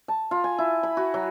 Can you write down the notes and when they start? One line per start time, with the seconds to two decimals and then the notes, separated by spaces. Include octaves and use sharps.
0.08 A5
0.31 F4
0.44 G#5
0.59 E4
0.83 B5
0.97 F#4
1.14 F#3